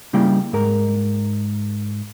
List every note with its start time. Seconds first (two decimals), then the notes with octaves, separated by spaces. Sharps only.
0.13 C#3 G3 A#3 E4 G5
0.53 G#2 A#4